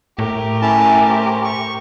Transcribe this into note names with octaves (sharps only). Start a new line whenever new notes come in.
A2 A3 G4 A#4
C#4 E4 A5
C5
C#6